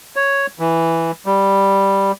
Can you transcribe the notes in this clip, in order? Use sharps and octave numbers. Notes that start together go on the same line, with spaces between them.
C#5
E3
G3